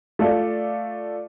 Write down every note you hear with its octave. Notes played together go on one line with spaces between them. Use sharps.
A3 F4 A4 D5